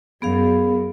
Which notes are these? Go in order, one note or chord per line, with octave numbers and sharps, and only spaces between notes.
F#2 B3 G#4 F5